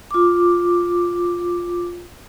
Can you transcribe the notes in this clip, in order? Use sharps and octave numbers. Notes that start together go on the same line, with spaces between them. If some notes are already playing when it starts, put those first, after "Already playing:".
F4 D6